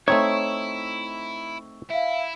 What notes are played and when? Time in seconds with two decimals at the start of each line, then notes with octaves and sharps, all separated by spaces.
0.08 A3 C4 D#4 E4 C#5 C#6 E6
1.90 E4 E5 F5